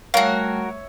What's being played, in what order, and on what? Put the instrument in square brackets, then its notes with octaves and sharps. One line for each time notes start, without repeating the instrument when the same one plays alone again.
[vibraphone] G3 A3 [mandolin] F#4 A#4 [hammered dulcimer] C#5 E5 [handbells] F5